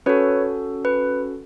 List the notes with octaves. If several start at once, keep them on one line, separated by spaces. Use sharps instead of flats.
C#4 F#4 A4 B4 C#5
B4